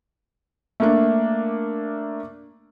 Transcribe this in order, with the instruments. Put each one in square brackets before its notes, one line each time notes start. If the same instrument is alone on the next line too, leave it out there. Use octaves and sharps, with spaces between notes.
[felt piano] A3 A#3 D4